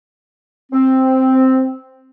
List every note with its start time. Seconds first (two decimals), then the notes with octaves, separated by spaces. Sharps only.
0.72 C4